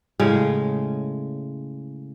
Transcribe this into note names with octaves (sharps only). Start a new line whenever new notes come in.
A2 C#3 G#3